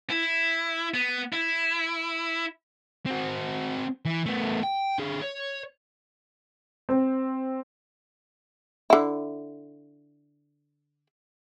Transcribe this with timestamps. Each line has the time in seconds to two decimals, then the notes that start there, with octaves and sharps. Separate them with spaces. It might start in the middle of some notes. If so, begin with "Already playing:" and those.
0.10 E4
0.94 B3
1.33 E4
3.06 C4 F#4
4.05 E3
4.26 A3 B3
4.63 G5
4.99 D3 G#4
5.22 C#5
6.89 C4
8.90 D3 E4